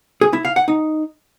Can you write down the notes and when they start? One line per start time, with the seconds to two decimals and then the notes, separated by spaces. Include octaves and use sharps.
0.21 G#4
0.33 E4
0.45 F5
0.56 F#5
0.68 D#4